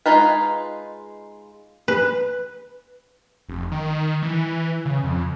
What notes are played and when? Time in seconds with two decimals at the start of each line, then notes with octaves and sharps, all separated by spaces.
0.06 G#3 D#4 F4 B4
1.88 B4
3.49 F1
3.72 D#3
4.22 E3
4.85 C#3
5.03 F2